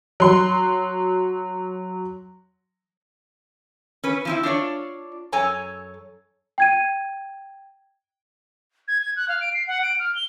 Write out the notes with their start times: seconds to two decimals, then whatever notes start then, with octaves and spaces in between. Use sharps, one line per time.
0.20 F#3 C6
4.04 C#4 B4
4.25 F3 C4 E4
4.43 D4 F4 C#5 D5
5.32 F#2 A4 C#5 G#5 A#5
6.58 G5 G#6 D#7
8.88 G#6
9.02 G#6
9.16 F#6
9.29 F5
9.41 D7
9.54 C7
9.67 F#5
9.83 D7
9.99 F6
10.15 G7